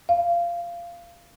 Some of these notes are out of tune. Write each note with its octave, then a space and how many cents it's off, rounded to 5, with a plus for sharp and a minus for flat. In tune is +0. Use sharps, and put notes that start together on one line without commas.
F5 -15